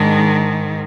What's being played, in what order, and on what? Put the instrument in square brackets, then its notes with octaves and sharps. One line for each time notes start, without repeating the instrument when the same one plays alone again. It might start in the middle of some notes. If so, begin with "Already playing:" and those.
Already playing: [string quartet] G#2 D#3 G#3 D4